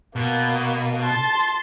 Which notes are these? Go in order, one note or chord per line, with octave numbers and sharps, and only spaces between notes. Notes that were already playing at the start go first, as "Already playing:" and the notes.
B2 A#3
A5 C6